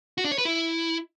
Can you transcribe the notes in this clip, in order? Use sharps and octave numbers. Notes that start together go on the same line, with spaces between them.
F#4
D4
C#5
B4
E4